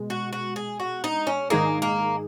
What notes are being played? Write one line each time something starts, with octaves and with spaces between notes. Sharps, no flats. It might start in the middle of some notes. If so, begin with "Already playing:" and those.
Already playing: B2 G#3
F#4
F#4
G#4
F#4
D#4
C#4
G#2 D#3 G#3 A#3 D#4 G#4
A#3